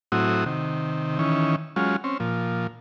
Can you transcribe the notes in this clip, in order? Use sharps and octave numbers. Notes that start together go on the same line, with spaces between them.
A2 F#3 C4 E4 F#4 D#6
C3 D#3
D#3 E3 C#4
F#3 G#3 C#4 F4
C4 C#4
A#2 F3